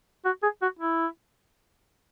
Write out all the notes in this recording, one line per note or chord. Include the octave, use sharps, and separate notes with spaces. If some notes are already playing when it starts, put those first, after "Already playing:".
F#4
G#4
F#4
E4